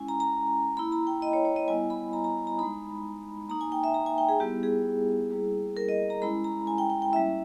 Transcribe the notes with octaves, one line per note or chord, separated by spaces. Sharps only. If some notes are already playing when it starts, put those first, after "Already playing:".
Already playing: G#3 C#4 E4 G#5
A#5
A#5
A#3 E4 B5
A#5
G5
D#5
C#5
C#5
D#5
G3 B3 E4 G#5
B5
A#5
A#5
A#5
G#3 D#4 B5
A#3 D#4 A#5
G#5
G5
E5
A#5
G#5
G5
G#4
G3 B3 E4 G4
G#4
G3 A#3 E4
A#4
D#5
A#5
G#3 C#4 E4 B5
A#5
G#5
G5
G5
G5
G3 A#3 C#4 E4 E5